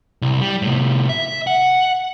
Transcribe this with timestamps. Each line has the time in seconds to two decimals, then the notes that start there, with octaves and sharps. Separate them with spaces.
0.22 C2
0.41 G3
0.62 A2 C3
1.09 E5
1.47 F#5